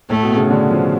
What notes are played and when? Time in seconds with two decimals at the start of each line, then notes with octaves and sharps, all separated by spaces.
0.10 A2 A3
0.23 B2
0.36 C#3
0.50 D3
0.71 F3